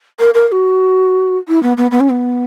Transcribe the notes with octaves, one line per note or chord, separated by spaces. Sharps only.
A#4
A#4
A#4
F#4
E4
B3
B3
B3
C#4
B3